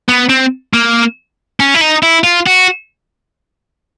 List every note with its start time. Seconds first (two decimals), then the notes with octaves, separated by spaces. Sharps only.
0.09 B3
0.29 C4
0.74 A#3
1.60 C#4
1.75 E4
1.81 D#4
2.03 E4
2.24 F4
2.46 F#4